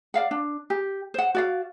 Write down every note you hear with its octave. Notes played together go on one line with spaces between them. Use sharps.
D5 F5 F#5
D4
G4
C5 F#5
F#4 D5 F5